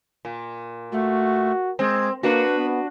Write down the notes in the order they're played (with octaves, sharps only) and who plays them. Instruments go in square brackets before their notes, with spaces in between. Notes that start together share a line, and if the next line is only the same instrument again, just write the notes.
[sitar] A#2
[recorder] A3 [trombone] F#4
[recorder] G#3 [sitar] C4
[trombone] A#3 [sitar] D4 F#4 [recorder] B4
[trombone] B3